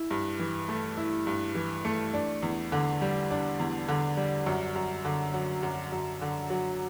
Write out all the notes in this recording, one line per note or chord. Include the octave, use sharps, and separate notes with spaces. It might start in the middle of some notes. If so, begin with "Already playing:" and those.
Already playing: E4
G2
E3
A3
E4
G2
E3
A3
D4
E2
D3
G3
D4
E2
D3
G3
F#2
F#2
D3
F#3
F#2
F#2
D3
F#3